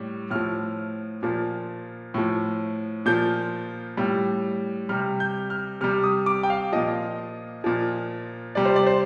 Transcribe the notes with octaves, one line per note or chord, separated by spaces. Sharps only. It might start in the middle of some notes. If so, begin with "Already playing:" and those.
Already playing: A2 G3
A2 F3 F6
A#2 F3
A2 F3
A#2 F3 G6
A2 G3
C3 G3 F6
G6
F6
C3 G3 F6
D#6
D6
G5
F5
A#2 F3 D#5
A#2 F3
C3 G3 D5
C5
D5
C5